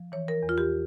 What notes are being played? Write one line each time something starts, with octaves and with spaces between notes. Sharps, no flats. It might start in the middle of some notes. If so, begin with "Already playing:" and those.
Already playing: F3
E3 C#5
A#4
E2
F4
G4